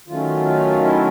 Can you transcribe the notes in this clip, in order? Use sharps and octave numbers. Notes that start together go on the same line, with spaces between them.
D#3 F#3 A3 C#4 F4
F4
E4